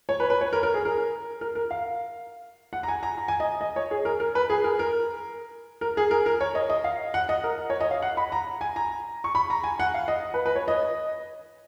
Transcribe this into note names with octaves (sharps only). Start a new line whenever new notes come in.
C#5
B4
B4
C#5
A#4
A#4
G#4
A#4
A#4
A#4
F5
F#5
A#5
G#5
A#5
A#5
G#5
D#5
D#5
C#5
G#4
A#4
A#4
B4
G#4
A#4
A#4
A#4
G#4
A#4
A#4
C#5
D#5
D#5
F5
F#5
D#5
A#4
C#5
D#5
F5
F#5
B5
A#5
G#5
A#5
C#6
B5
A#5
G#5
F#5
F5
D#5
B4
B4
C#5
D#5